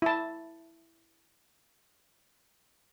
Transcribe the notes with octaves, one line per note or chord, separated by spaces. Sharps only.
E4 A5